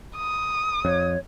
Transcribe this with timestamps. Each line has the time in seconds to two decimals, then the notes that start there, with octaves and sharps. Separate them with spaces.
0.17 D#6
0.85 F2 C#5